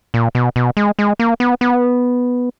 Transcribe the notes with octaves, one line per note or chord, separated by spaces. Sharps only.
A#2
B2
B2
G#3
G#3
A#3
B3
B3